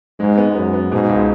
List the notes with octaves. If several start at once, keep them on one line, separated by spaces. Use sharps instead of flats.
G#2 G#3
B3
F#2 B3
B3
G#2 B2
C#2